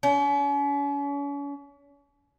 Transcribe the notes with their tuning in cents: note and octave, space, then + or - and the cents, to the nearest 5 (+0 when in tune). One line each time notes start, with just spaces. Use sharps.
C#4 +40